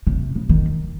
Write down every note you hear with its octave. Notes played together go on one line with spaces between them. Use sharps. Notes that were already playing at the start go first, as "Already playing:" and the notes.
C3
C#3
D#3